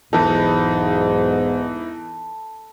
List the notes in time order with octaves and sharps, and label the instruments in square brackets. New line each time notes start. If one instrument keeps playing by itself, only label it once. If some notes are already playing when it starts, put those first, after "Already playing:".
[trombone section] B1 E2 G#2 [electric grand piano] E3 B3 D#4 [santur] A4 B4